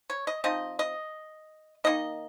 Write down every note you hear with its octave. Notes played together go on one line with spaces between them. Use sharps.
C#5
D#5
F3 C4 D#4 D#5
D#5
D#3 A#3 D#4 D#5